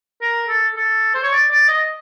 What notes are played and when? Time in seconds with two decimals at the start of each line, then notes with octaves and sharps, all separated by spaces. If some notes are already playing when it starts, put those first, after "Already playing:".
0.22 A#4
0.49 A4
0.77 A4
1.14 C5
1.23 C#5
1.33 D5
1.51 D5
1.68 D#5